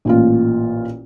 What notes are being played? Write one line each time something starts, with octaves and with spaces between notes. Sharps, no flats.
A1 A#2 F4